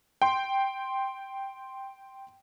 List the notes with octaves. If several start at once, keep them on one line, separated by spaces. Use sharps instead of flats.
G5 C6